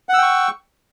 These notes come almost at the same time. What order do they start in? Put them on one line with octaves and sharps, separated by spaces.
F#5 E6 G5 C#6